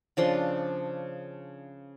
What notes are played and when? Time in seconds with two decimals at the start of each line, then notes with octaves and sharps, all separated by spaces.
0.17 C#3 F3 D4 C6